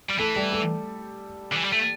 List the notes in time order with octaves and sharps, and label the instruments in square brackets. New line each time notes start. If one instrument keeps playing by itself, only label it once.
[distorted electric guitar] G3
[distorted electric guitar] E3 [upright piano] A3 A4
[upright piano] G3 G4
A3 A4
[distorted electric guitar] D3
E3
G3
A3